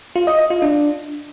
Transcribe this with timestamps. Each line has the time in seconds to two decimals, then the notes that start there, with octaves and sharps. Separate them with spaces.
0.16 F4
0.27 D#5
0.39 D#5
0.50 F4
0.62 D4